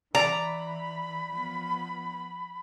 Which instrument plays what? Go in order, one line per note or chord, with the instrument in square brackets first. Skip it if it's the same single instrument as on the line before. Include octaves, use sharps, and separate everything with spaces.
[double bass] E3 [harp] D5 [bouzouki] A#5 [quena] B5
[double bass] F3 B3